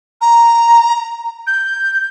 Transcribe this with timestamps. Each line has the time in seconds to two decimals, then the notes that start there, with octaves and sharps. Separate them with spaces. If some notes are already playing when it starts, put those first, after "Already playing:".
0.21 A#5
1.47 G6